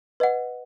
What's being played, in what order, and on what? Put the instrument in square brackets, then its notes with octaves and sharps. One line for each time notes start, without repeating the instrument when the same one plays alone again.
[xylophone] B4 D#5 F#5